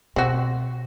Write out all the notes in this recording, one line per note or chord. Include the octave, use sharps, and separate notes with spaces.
B2 C4 F#4